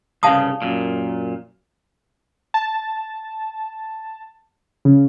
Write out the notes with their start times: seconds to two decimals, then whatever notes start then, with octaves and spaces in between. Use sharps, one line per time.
0.23 C2 G2 C#3 F5 A5 D#6
0.62 F#2 A#2
2.54 A5
4.85 C#3